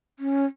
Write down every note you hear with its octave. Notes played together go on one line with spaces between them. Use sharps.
C#4